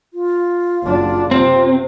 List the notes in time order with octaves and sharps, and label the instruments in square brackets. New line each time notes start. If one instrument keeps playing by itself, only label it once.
[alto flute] F4
[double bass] F#1 D4
[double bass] C3 [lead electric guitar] C4